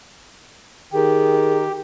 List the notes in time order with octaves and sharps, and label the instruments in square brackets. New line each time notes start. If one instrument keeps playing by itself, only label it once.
[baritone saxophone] D#3 [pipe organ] G4 [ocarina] G#4